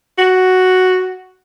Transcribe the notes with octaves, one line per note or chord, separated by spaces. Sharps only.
F#4